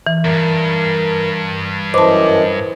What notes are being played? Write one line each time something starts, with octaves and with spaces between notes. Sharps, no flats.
E3
E2 G2 A#4
F#2 E3 B4 C5 D#5 A5 D6